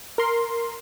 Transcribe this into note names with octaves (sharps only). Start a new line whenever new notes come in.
A#4 C6